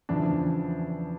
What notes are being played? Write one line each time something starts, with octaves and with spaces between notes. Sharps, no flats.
E2 C#3 F3 D4